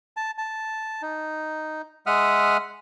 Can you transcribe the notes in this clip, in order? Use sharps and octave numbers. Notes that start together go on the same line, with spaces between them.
A5
A5
D#4
G#3 E5 F#5 D#6 F6